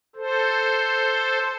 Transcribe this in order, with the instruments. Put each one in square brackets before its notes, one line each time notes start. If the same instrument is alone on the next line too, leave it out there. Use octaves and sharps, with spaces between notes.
[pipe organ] A4 C5